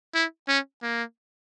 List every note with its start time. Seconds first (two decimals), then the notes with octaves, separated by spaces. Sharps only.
0.14 E4
0.48 C#4
0.82 A#3